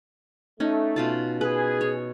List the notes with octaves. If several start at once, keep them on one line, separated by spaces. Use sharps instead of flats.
A3 C#4 D#4
B2 F4 A5
G#4 B4
C#5